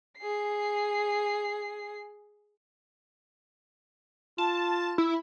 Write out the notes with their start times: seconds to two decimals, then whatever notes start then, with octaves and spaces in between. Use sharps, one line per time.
0.19 G#4 C7
4.38 F4 A5
4.98 E4